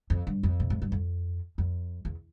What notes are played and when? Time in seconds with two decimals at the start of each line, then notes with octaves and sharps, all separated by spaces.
0.10 F2
0.27 G2
0.43 F2
0.60 A#2
0.70 A2
0.82 G2
0.92 F2
1.58 F2
2.05 E2